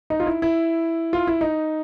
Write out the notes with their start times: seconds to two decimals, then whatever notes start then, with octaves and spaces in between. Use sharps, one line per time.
0.10 D#4
0.20 F4
0.26 E4
0.42 E4
1.13 F4
1.27 E4
1.41 D#4